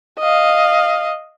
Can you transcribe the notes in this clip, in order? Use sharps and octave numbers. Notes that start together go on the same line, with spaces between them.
D#5 F5